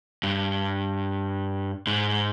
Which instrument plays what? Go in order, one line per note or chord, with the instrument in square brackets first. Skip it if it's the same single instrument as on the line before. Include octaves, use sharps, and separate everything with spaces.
[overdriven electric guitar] G2
G#2